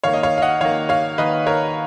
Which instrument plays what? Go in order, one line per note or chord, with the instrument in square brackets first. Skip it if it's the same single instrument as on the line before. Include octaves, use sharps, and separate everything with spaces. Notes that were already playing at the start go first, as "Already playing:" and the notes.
[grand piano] D#3 A#3 C#5 F5
D#5
C#5 F5
F5
D#5 F#5
D#3 A#3 C#5 F5
C#5 F5
D#3 A#3 B4 D#5
A#4 C#5